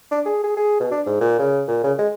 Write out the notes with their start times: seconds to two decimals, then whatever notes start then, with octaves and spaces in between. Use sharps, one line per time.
0.11 D4
0.25 G#4
0.44 G#4
0.57 G#4
0.80 B2
0.91 D4
1.06 G#2
1.21 A#2
1.39 C#3
1.68 A#2
1.84 C#3
1.98 G#3